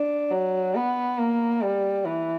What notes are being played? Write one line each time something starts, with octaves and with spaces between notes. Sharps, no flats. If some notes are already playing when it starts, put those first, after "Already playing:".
Already playing: D4
F#3
B3
A#3
G3
E3